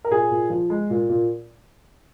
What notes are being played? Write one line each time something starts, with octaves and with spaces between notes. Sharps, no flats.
A#4
A#2 G#4
A#2
F3
G#3
A#2
A#2